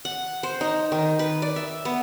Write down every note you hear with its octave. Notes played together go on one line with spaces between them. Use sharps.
F#5
C5
D#4
D#3
B4
D5
E5
B3